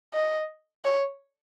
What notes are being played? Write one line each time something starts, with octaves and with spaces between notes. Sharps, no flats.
D#5
C#5